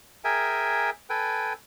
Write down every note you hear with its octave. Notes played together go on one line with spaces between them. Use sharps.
G#4 A#4 E5 G5 G#5
A4 B4 G5 G#5